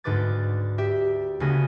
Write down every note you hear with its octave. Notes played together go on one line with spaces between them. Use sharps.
D2 G#2 D3 B4 D6 A6
G4 E5
D2 C#3 B3 G#5 A#6